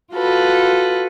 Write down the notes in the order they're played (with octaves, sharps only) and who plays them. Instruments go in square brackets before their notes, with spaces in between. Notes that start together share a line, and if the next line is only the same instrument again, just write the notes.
[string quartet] F4 F#4 A4 B4